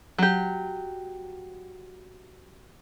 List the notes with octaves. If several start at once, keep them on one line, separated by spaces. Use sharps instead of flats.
F#3 G4